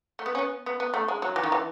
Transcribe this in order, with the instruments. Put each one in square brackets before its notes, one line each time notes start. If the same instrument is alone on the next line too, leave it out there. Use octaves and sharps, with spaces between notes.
[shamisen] A3
B3
C#4
B3
B3
B3
A3
G#3
F#3
E3
D#3
E3